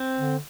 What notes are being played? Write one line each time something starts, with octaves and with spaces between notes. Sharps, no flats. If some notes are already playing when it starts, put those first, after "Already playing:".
Already playing: C4
D3